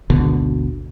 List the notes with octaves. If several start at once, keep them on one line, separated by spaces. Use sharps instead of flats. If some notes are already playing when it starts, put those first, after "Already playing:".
G#1 D2 B2 D3